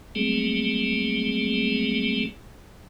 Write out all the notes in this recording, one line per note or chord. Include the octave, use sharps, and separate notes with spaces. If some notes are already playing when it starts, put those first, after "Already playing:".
F#3 G3 A3 A#3 C4 G#4